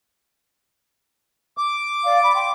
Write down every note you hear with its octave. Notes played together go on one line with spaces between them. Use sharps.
D6
D5 F5
B5
G5 C6